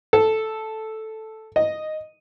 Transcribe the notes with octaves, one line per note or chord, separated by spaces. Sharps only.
A4
D#5